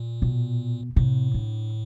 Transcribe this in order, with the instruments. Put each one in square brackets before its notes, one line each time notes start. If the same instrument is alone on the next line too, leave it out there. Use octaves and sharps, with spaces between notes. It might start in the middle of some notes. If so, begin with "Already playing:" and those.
Already playing: [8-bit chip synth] A#2
[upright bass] B2
[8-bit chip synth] A2 [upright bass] C3
[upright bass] D3